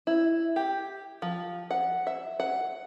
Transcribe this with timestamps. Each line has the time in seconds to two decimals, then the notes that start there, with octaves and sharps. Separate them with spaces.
0.07 E4
0.56 G4
1.22 F3
1.71 F#5
2.07 E5
2.40 F#5